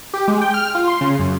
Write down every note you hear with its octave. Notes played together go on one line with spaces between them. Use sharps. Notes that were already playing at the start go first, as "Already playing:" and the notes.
G4
G#3
G5
F6
F4
C6
C#3
F#2